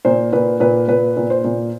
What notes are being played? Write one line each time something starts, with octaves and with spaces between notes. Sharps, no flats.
A#2 C5
A#2 B4
A#2 B4
A#2 B4
A#2
C5
A#2